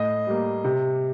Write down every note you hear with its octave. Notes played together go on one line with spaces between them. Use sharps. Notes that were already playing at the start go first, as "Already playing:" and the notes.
Already playing: A2 D#5
G3 A#3
C3